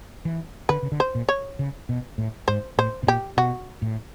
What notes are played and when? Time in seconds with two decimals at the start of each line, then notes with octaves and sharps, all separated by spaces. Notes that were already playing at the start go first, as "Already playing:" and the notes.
0.25 E3
0.69 D3 B4
0.83 C#3
0.92 D3
1.00 C5
1.15 A#2
1.29 C#5
1.59 C#3
1.89 B2
2.18 A2
2.48 G#2 C5
2.78 A2 C5
3.03 B2
3.07 A#2 G4
3.37 B2 F#4
3.82 A2